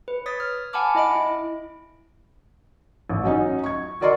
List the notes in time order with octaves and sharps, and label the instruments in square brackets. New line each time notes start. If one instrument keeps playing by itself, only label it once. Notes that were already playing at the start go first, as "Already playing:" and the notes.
[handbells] B4
C#5 D#6 A6 B6
F6
F#5 G#5 A5 B5 D6 F6
E4 D#5 B5 D7
E4
[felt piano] A1
F#3 C#4 D#4
C#6 G#6
F#4 A#4 D5 D#5 C6 C#6